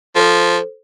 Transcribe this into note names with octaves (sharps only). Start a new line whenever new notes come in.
F3 A4 C5